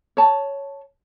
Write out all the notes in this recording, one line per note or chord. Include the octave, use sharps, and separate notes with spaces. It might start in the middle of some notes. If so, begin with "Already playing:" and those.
C#5 A5